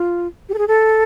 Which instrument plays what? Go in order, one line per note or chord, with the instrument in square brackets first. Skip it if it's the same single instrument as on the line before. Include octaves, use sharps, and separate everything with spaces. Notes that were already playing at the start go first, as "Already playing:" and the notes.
Already playing: [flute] F4
G4
A4
G#4
A4